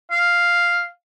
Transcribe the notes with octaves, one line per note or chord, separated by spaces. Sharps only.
F5